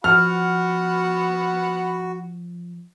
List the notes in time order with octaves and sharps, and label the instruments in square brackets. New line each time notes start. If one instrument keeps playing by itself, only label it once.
[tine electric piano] F3 [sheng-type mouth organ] F#4 [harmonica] F#5 B5 [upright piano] F6